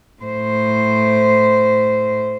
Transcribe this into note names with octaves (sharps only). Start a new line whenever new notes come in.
A2 C5